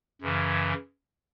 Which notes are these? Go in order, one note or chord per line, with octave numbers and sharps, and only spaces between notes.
F#2 C#3 E3